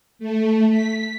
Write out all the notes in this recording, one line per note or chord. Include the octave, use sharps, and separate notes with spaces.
A3
B6